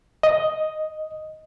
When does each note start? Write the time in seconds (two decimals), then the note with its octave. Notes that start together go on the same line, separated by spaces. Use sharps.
0.23 D#5